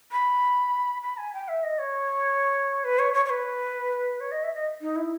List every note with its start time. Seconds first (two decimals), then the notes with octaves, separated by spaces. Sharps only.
0.12 B5
1.02 B5
1.17 G#5
1.33 G5
1.48 E5
1.63 D#5
1.79 C#5
2.84 B4
2.99 C#5
3.14 C#5
3.25 C#5
3.30 B4
4.20 C#5
4.31 D#5
4.43 E5
4.54 D#5
4.81 D#4
4.96 E4